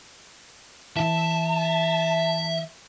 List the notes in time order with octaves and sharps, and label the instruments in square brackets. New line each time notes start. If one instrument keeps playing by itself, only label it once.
[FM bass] E3 [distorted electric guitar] E5 [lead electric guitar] A5